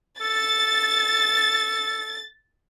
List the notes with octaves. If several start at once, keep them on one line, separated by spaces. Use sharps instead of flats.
A4 A6